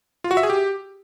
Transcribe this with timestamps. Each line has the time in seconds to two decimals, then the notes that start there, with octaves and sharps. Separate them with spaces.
0.24 F4
0.31 F#4
0.37 E5
0.43 G#4
0.50 G4